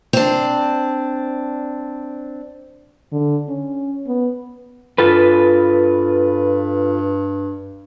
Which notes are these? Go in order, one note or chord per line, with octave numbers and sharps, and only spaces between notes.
C4 D4
D3
C#4
B3
G2 F4 A4 B4